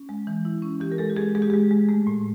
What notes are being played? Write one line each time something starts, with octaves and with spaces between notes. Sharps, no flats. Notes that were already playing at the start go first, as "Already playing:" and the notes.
Already playing: C#4
G#3
E3
E4
C#4
E3 G4
A#4
G#3 A4
G4
G#3 G#4
G#3 G#4
G4
G#3 G#4
G#3
A3
A2